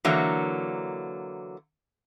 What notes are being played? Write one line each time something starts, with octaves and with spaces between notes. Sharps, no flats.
D3 E3 F#3 A#3